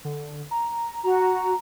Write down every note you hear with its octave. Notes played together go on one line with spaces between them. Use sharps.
D3
A#5
F#4 A#5